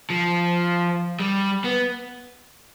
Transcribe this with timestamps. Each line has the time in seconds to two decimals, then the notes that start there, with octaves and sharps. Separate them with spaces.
0.10 F3
1.20 G3
1.64 B3